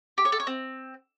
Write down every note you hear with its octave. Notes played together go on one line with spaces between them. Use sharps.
G4
C#5
A4
C#5
C4